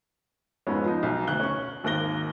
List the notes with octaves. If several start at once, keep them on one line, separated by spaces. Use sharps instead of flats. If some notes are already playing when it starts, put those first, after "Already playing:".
F2 G#2 G#3 B3 C#4
F3 D#4
B1 B2
D2 F#6 G7
C#4 C#6
G#1 D#2 A#4 F#6 A#6 G7